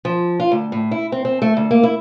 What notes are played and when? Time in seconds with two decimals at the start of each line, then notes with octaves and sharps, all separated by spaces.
0.05 F3
0.40 F4
0.52 D2
0.72 A2
0.91 E4
1.12 C4
1.25 C4
1.42 A3
1.57 D2
1.71 A#3
1.83 E4